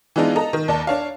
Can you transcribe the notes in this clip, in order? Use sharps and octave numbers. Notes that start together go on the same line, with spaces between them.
E3 G#3 B3 D4 D#4 F4
A4 D#5 A#5
D#3
D#2 D5 A5
D4 C#5 F5